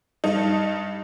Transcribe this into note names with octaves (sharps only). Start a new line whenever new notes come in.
G2 D#4